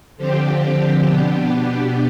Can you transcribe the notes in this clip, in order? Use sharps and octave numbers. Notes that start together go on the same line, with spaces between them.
D3 F3 C4 G4
B2 B3 D4 G4